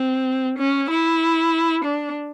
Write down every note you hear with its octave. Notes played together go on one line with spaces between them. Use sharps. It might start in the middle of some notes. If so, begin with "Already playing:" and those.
Already playing: C4
C#4
E4
D4